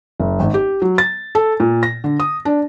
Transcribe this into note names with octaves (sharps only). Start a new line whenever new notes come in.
F#1
G#1
G4
F#3
A6
A4
A#2
A#6
D3
D#6
D4